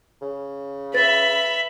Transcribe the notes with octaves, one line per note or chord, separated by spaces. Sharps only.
C#3
B4 E5 B5 A6